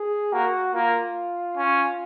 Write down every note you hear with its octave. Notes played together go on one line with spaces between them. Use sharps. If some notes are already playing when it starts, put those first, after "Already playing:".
Already playing: G#4
A#3 F#4
A#3 F4
C#4